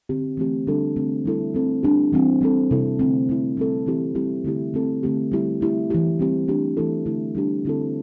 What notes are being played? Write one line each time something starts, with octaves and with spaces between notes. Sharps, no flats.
D3 C4 G4
E3 A3 C4 G4
D3 G3 D4 A4
D3 A3 C4
G3 E4 A4
A3 C4 A4
G3 D4 G4
E3 G3 C4 E4
G3 C4 A4
C3 G3 E4 A4
D3 A3 C4
C3 A3 E4
G3 C4 A4
E3 C4 E4 G4
G3 C4 E4 G4
D3 A3 E4 G4
A3 C4 A4
D3 A3 C4 G4
G3 E4 G4
A3 E4 G4
E3 A3 E4 G4
G3 C4 G4
E3 A3 D4 G4
E3 A3 E4 A4
D3 A3 E4
G3 D4 G4
D3 C4 E4 A4